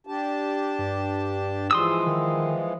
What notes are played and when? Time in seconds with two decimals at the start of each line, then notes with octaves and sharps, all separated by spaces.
0.07 D4 G4 A5
0.79 G2
1.71 E3 F3 G#3 C6 D#6 E6
2.07 D#3